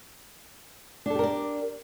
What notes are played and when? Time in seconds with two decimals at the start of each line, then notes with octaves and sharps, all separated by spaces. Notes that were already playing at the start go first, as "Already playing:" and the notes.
1.06 D4
1.10 A4
1.15 G4
1.19 A#4
1.23 D5